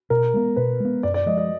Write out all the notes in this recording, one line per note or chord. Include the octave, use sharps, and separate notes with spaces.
B2 A#4
G#3 B3
B2 B4
G#3 B3
F#2 D5
D5
F3 G#3 D#5
D#5